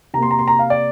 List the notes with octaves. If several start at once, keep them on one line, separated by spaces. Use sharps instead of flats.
C3 A#3 A#5 C6
A#5
C6
A#5
F5
D5